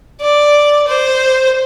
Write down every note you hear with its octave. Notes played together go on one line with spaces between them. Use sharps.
D5
C5